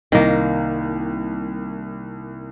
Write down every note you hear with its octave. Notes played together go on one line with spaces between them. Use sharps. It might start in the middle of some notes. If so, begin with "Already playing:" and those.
C2 D#3 A#3